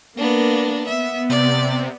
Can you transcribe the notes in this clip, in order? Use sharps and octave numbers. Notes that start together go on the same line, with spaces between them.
A#3 B3 D4
B3 E5
C3 D5